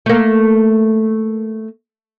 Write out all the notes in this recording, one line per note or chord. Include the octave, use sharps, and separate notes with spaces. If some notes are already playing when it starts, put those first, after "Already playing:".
A3 A#3